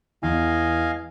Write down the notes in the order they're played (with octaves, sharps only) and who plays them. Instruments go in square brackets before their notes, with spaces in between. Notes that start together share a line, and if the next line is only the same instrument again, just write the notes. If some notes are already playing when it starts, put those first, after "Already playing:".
[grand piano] E2 [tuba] E3 [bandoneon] D#5 F5 G#5